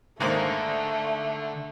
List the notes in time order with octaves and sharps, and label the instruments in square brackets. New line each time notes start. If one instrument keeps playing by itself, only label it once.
[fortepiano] G#2 D#3 A#3 [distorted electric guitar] D3 [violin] A3 [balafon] D4 C5 A#5